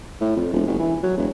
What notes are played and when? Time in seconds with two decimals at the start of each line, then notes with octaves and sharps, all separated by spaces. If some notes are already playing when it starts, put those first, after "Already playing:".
0.21 A2
0.36 F2
0.53 E1
0.67 F#1
0.79 E3
1.03 F#3
1.17 E1